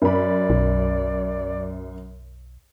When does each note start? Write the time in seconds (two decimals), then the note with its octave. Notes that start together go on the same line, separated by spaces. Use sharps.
0.02 F#2 D5 B5
0.50 B1